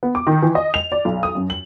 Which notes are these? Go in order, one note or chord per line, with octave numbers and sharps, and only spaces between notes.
B3
D6
D#3
E3
D#5
F7
D5
B1
D#6
F#2
F#7